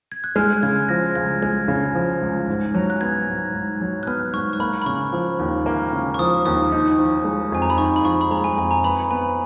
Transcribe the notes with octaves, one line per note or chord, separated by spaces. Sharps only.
G#6
F#6
G#3 F6
C#3 G#6
F3 A#6
C#2 G#6
G#3 G#6
C#3
F3
C#2
G#2
F#3
F#6
B3 G#6
G#2
G#2
F#3
F#6
B3 F6
G#2 C#6
C#6
A#3 B5
B5
C#3 C#6
F3
D#2
A#3
C#3
C#6
F3 D#6
D#2 D#6
D#4
F3
G#3
F2 G#5
A#5
B5
D#4 C#6
B5
F3 C#6
B5
G#3 A#5
G#5
F2 G#5
A#5
B4 B5
B3 G#5